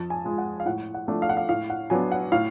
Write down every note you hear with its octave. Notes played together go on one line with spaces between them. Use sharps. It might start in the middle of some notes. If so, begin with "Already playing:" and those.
Already playing: F2 A5
G#5
F3 G#3
F#5
F5
A2 F#5
F#5
F3 A3 D4
F5
F#5
F5
A2 F5
F#5
F#3 B3 D4 G#5
F#5
A2 F5